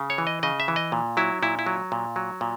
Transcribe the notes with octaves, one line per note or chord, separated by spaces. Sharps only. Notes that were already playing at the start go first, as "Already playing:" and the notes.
Already playing: C#3
C#5
E3
D#5
C#3 D#5
E5
E3
D#5
A#2
F#3 E4
A#2 E4
E4
F#3
A#2
F#3
A#2